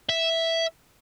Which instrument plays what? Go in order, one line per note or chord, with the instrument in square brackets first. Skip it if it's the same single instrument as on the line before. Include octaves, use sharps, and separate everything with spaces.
[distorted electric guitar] E5